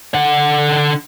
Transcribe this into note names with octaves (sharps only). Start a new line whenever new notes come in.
D3 F#5